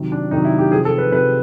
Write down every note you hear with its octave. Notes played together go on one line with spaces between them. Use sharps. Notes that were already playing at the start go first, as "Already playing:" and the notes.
Already playing: C3 D#3 F#3
D4
C3 D#3 F#3 D#4
E4
G4
C3 F3 G#4
A4
B4
C3 F3 B4